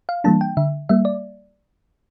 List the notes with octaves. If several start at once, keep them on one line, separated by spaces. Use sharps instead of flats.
F5
E3 G3 A#3 D4 A5
G5
D3 E5
G3 A#3 E5
D5